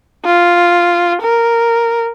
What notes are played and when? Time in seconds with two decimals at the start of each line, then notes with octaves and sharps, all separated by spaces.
0.25 F4
1.21 A#4